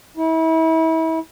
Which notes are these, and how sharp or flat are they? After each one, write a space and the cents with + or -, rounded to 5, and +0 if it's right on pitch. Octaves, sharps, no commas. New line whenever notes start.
E4 -35